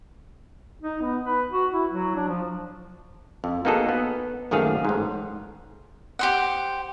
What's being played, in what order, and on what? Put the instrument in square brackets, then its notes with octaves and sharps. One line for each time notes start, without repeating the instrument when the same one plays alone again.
[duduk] D#4
B3
B4
F#4
E4
F#3
D4
F3
[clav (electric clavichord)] F2
A#3 B3 D#4 F#4 G#4 A4
B3
A#1 F#2 D#3 A3 G#4 F5
A1 G#2
[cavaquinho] G4 C5 F#5